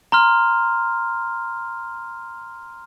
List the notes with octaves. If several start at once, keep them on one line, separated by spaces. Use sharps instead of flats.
A#5 C6 F6